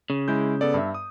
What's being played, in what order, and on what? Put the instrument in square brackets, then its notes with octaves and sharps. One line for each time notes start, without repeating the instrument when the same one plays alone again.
[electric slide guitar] C#3
[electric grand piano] G#3 E4 G6
B3 A4 D5
G2 E5
D#6